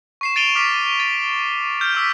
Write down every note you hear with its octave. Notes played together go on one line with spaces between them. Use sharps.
C#6 C7 E7
A6 D7 D#7 F7 G7
D6 F6 B6
A6
F6 G6
D6 E6 B6